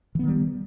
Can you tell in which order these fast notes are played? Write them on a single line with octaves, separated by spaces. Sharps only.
E3 B3 D#3 G3